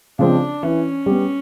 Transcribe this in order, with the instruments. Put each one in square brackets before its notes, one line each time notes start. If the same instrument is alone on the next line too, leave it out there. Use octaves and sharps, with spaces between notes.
[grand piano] C#3 F3 G#3 C4 [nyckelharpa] D4
[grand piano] E3 [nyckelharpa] C#4
[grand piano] G3 B3